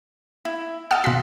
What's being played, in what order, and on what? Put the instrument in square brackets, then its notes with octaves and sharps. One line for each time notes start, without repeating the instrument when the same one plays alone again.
[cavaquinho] E4
[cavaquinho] D#5 A5 [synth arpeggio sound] F#5 E6 F6
[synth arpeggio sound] B2 F5 B6 [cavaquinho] F#4 C6